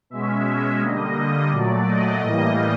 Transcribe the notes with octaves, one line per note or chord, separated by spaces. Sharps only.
B2 G#3 C#4 E5
D3 G3 A#3 D#5
A#2 F#3 A3 D5
D#5
A2 E3 G3 A#3 D#5